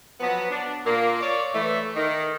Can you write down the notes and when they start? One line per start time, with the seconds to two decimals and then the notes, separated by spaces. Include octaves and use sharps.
0.21 F3 F#3 B3
0.51 D4
0.86 A#2 A#3
1.21 C#5 D5
1.55 E3 A3
1.96 D#3